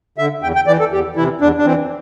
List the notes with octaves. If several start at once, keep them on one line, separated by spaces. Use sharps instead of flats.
D3 E5
E2 G5
G5
E3 D5
A4
E2 G4
C3 E3 E4
E2 D4
D4
E3 C4